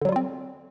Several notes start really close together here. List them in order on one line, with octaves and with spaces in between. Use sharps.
D3 F#3 G3 F4 C4